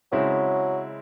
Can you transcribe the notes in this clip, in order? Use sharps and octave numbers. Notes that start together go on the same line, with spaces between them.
C#3 F#3 G#3 C4 E4